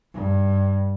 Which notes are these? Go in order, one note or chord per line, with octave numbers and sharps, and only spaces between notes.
G2